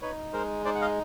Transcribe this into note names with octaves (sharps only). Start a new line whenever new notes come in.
D#4 B4 C#5
G#3 A#4 C5
D#4 C5 D5
F#5
D#5 F5